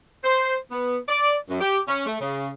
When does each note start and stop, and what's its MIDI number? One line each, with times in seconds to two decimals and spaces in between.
0.23 0.56 72
0.71 0.97 59
1.09 1.35 74
1.49 1.59 42
1.61 1.79 67
1.88 2.07 61
2.07 2.17 57
2.21 2.50 49